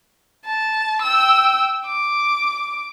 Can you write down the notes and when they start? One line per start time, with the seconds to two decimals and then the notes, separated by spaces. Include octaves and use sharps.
0.45 A5
1.02 G5 E6
1.86 D6